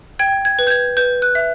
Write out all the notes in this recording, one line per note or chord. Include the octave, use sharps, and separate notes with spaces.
G5 G#6
G#6
B4
G6
G#6
B4 G6
F#6
E5